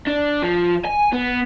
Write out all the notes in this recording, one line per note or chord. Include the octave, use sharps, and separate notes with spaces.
D4
F3
G#5
B3